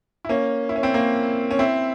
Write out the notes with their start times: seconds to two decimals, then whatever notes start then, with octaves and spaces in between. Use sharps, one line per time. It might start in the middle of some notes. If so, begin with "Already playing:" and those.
0.25 E4
0.29 A#3 C#4
0.69 E4
0.76 C#4
0.83 C4 E4
0.94 A#3 C#4
1.51 C#4
1.59 C4 E4